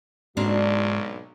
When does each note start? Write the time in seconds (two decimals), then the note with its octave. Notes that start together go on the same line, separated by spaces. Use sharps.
0.37 B1 G#2 G#3 A#3 C4 D4 F#4